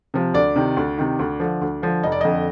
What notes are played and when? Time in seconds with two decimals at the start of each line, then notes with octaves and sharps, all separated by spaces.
0.14 C3 F3
0.34 D2 D5
0.56 C3 D#3
0.77 D2
0.98 C3 D#3
1.19 D2
1.40 D3 F3
1.61 D2
1.82 D3 F3
2.03 F1 D#5
2.12 D5
2.21 F2 D3 D#5